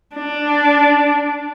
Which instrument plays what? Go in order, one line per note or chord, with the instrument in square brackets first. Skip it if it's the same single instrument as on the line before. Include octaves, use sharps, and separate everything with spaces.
[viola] D4